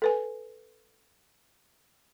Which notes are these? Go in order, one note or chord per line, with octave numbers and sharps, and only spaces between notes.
A4 B4 G#5